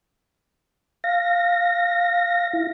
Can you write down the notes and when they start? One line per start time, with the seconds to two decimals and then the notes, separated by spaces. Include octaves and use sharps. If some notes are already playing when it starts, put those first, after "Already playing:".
1.04 F5 A#6
2.53 E4